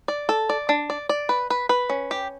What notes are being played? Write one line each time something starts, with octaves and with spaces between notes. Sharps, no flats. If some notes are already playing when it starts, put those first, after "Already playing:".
D5
A4
D5
D4
D5
D5
B4
B4
B4
C#4
G4